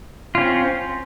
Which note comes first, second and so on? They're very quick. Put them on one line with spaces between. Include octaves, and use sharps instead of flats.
F4 C#4 C4